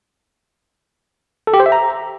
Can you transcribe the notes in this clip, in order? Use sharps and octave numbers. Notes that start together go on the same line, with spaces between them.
A4
G4
C5
E5
A#5